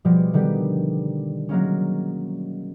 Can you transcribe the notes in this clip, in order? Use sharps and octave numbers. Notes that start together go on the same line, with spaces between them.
B2 F3 G3 G#3
D3 D#3 G3 B3 G4
F#3 G#3 A#3 C#4